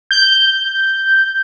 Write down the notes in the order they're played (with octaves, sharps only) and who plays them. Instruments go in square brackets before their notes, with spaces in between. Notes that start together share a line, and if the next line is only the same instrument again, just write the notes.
[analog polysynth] G6